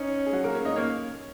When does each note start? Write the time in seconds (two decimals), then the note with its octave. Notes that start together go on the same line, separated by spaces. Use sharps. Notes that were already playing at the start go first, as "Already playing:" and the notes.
Already playing: C#4 D#4
0.26 G#4
0.32 F#3 F#4
0.44 A#3 A#4
0.54 C#4 C#5
0.65 D#4 D#5
0.76 A#3 C#4 C#5